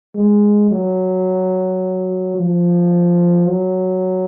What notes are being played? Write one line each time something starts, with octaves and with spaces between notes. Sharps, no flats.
G#3
F#3
F3
F#3